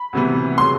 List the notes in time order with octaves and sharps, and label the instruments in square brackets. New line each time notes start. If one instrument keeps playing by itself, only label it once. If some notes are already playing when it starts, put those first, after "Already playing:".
Already playing: [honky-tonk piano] B5
[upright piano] D2 C3 E3 G3 B3
[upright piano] C#3 F#3 [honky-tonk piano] C6